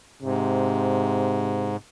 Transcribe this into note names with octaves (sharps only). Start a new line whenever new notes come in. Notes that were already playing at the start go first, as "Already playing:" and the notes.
G#2 C3